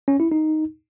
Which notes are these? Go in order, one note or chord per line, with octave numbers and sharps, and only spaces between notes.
C#4
E4
D#4